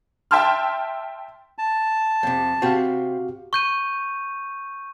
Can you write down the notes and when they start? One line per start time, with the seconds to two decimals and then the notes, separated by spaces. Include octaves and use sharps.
0.31 E5 G5 A5 C6 F6
1.58 A5
2.23 F2 C3
2.62 C3 C4 F#4 G4 F5
3.53 C#6 G6 D#7